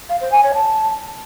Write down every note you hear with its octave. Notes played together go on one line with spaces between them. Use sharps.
F5
C5
G#5
C#5
A5